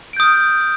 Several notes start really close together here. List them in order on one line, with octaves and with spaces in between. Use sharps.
D7 G6 D#6 F6